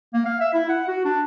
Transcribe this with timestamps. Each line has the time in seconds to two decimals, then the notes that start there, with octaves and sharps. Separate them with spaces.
0.14 A#3
0.26 F5
0.41 E5
0.54 E4
0.69 F#5
0.88 F#4
1.05 D4